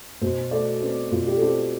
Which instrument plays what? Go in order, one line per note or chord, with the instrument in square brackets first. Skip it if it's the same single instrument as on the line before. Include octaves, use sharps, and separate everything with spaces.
[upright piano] B2 C5
A3 D5
C4 B4
B2 F4
G4
A4
C4 G4